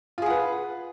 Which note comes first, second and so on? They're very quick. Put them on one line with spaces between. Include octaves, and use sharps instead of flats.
F4 G#4 F#5 B4